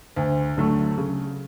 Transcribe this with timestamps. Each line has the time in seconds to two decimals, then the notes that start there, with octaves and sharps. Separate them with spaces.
0.16 D2
0.57 D3 F#3 A3
0.98 C#3